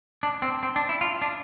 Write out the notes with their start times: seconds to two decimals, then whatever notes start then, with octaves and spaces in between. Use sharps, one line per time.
0.23 D4
0.42 C4
0.63 C4
0.76 D4
0.89 E4
1.01 F4
1.22 D4